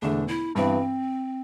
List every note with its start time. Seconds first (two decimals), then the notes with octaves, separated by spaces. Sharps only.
0.02 E1 E2 D3 A3 D4
0.28 E4
0.55 G2 E3 B3 C4